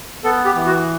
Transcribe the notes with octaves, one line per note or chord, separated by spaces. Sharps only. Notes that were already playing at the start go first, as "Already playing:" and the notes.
B3 A4
G4
E3
F#4